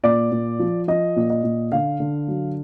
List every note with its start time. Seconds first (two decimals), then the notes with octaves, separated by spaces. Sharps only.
0.03 A#2 D5
0.32 A#2
0.59 F3
0.88 F3 D#5
1.16 A#2
1.30 D#5
1.44 A#2
1.72 D3 F5
2.00 D3
2.28 F#3